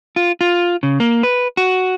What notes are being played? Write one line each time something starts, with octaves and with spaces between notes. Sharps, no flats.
F4
F4
C#3
A#3
B4
F#4